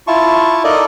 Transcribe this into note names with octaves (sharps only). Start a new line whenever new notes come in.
E4 F4 A5 C#6
D#4 A4 A#4 D5 D#5